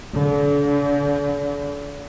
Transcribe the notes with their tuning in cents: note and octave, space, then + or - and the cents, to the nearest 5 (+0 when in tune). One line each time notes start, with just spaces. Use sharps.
D3 -40